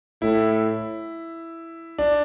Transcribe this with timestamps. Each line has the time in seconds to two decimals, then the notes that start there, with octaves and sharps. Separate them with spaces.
0.22 A2 E4
1.98 D4